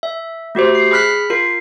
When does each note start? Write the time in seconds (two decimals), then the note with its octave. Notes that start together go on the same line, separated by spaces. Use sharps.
0.03 E5
0.55 A3 F#4 G4 C5
0.75 C7
0.91 G#4 B5 F6 F#6 B6
1.30 F4 A#4 C7